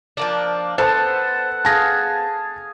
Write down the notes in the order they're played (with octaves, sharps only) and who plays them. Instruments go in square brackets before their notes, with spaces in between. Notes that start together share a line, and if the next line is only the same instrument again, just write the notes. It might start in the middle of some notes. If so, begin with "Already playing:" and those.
[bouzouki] F3 A#3 D4
[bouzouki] B3 [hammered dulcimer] A4 [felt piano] C5 A5 [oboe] F#5
[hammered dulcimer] G#4 F5 [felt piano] A5 A#6